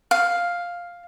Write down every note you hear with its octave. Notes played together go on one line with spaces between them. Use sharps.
F5